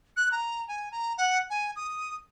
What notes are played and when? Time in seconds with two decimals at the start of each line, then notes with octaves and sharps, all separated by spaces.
0.16 F#6
0.32 A#5
0.68 G#5
0.92 A#5
1.18 F#5
1.50 G#5
1.76 D#6